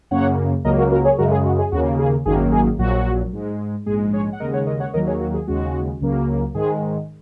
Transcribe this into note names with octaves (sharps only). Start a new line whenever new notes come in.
F#2 C#3 A#3 C#5 F#5
C#2 C#3 F#3 A#3 A#4 D#5
F#4 A#4
F#4 A#4
G#4 C#5
F#2 C#3 G#3 F#4 A#4
G#4
F#4
G#4
D#2 C#3 A#3 F#4
G#4
G#1 F#2 D#3 F#3 A#3 G#4
G#4
A#1 A#2 F#3 F#4
G#2 G#3
A#1 G#2 G#3 G#4
G#4 C#5
F#5
D#2 C#3 G#3 A#4 D#5
C#5 F#5
A#4 D#5
C#5 F#5
D#2 D#3 F#3 A#3 A#4 D#5
G#4 C#5
F#4
G#4
D#2 C#3 G#3 F#4
C#2 C#3 F#3 A#3
G#2 D#3 G#3 G#4